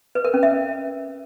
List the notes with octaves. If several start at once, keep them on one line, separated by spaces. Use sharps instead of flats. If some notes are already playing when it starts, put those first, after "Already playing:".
B4
A#4
C#4
E5